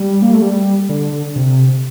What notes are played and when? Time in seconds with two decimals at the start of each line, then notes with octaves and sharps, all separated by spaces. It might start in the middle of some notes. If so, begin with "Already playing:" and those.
Already playing: G3
0.22 A#3
0.33 A3
0.42 G3
0.89 D3
1.36 C3